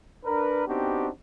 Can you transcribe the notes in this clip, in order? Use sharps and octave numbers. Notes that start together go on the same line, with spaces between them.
D4 A#4 B4
B3 C4 D4 D#4 F#4 G4